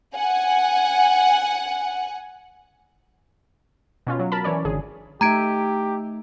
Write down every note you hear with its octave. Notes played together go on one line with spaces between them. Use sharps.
F#5 G#5
B2 C#4 F4
F#3
A#4 A5 B5
E3 C#4 C#5 D5
G#1 D3 G#4
A3 D#4 G4 E5 A#5 G#6 D7